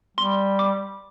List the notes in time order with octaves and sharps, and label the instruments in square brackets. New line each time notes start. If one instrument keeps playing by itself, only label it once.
[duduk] G3 [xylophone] C6
[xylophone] D6